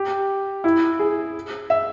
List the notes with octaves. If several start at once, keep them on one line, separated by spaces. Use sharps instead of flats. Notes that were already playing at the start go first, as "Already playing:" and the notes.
Already playing: G4
E4
G#4
E5